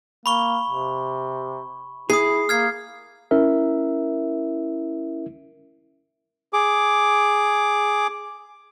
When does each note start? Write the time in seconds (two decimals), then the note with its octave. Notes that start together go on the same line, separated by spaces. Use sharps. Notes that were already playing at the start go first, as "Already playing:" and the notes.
0.26 A#3 B5 C#6 G7
0.68 C3
2.10 E4 G#4 D#6 C7
2.49 A#3 F6 G#6 C7
3.31 C#4 E4 A#4 E5
6.53 G#4 D6